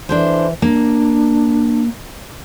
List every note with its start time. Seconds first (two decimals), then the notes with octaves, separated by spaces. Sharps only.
0.09 E3 D4 A4 C5
0.62 A#3 D4